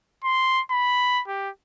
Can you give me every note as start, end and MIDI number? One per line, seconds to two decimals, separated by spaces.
0.24 0.61 84
0.71 1.22 83
1.28 1.49 67